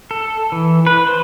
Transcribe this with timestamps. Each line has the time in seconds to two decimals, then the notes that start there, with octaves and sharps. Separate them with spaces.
0.11 A4
0.52 E3
0.87 B4
1.07 C5